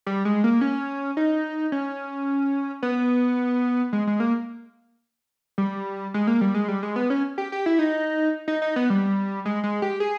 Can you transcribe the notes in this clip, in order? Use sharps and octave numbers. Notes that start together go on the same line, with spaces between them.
G3
G#3
A#3
C#4
D#4
C#4
B3
G#3
G#3
A#3
G3
G#3
A#3
G3
G#3
G3
G#3
B3
C#4
G4
G4
E4
D#4
D#4
D#4
B3
G3
G#3
G#3
G4
G#4